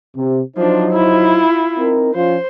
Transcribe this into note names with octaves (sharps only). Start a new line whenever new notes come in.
C3
F3 F#3 D4 D#4 C5
E4 F4
C4 D#4 A#4
F3 C#4 F4 C5